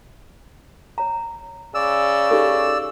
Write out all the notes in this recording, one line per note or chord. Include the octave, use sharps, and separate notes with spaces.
C#5 A#5
C#3 D5 E6
D#4 G4 A4